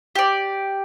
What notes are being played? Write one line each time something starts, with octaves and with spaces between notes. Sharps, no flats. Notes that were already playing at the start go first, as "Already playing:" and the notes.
G4 D5